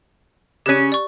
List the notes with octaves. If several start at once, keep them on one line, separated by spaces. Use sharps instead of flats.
C#3 C#4 G4 F#6 D#7
D5 C#6